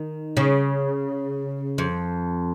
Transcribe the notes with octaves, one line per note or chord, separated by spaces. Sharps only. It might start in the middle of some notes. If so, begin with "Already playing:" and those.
Already playing: D#3
C#3
F2